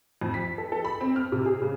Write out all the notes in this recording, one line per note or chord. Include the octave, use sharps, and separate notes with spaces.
F2
B6
A4
A4
B5
C4
F6
C3
G#4
C#3